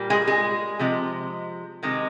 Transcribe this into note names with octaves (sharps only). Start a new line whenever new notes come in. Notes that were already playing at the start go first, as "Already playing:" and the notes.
Already playing: A#2 G3 A#3
G#3 G#4
G#3 G#4
C3 F3 G#3
C3 D#3 G#3